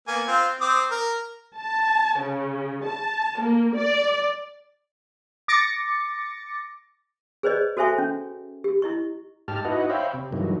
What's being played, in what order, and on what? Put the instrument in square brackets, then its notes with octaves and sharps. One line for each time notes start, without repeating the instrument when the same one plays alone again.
[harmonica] A#3 B3 G#5
C4 F4
C4 D6 D#6
A#4
[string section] A5
C#3
A5
A#3
D5
[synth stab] D6 A6 A#6 C#7
[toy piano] G#4 B4 C5 D5 D#5
F#4 A4 C5 E5 G#5 C#6
C#4
G4
E4 D#5 C#6
[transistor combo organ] G#2 G4 A5 F6
D#4 E4 F#4 B4 D#5 F#5
C5 C#5 E5 F5 G5 B5
C3
G2 D#3 E3 F#3 G#3